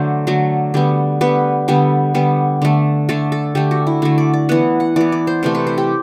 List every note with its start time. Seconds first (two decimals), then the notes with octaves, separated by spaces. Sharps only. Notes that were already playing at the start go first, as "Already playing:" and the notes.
Already playing: D3 F#3 A3 C5
0.27 D3 F#3 A3
0.74 D3 G3 B3
1.21 D3 G3 B3 B4
1.68 D3 G3 B3
2.14 D3 G3 B3
2.62 D3 A3
3.09 D3 A3 A4
3.32 A4
3.55 D3 A3 G4
3.71 F#4
3.87 E4
4.02 D3 A3 F#4
4.18 D5
4.33 D5
4.49 E3 B3 F#5
4.80 F#5
4.96 E3 B3 D5
5.12 D5
5.27 C5
5.43 C3 E3 A3 C5
5.55 B4
5.67 C5
5.78 G4